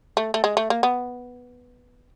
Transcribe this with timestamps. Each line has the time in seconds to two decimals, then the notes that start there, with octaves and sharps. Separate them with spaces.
0.17 A3
0.34 A3
0.44 G#3
0.57 A3
0.70 A#3
0.83 B3